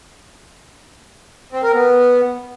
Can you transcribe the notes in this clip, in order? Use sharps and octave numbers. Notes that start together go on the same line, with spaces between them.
C4
A#4
B3